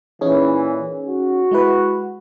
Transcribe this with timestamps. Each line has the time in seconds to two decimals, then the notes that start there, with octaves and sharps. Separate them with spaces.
0.21 A#2 E3 C#4 D#4 G#4
1.06 F#4
1.51 G#3 E4 B4